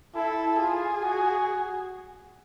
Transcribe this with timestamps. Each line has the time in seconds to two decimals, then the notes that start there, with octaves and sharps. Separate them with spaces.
0.15 E4 A4
0.59 F4 G#4
1.02 F#4